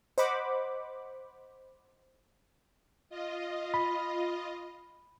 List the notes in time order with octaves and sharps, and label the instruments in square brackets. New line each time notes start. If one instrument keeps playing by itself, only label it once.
[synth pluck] C5 D#5 F#5 B5 D6
[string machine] F4 D#5
[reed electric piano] B5